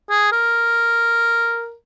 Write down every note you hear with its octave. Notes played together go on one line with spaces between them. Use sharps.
G#4
A#4